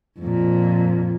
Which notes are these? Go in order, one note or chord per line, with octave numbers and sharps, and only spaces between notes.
F2 A#2